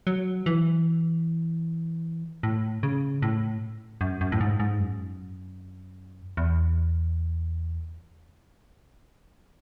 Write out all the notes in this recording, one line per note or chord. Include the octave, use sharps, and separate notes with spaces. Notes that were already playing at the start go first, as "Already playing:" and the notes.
F#3
E3
A2
C#3
A2
F#2
F#2
A2
G#2
G#2
F#2
E2